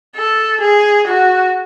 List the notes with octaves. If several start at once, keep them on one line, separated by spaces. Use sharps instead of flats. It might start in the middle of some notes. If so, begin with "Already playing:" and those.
A4
G#4
F#4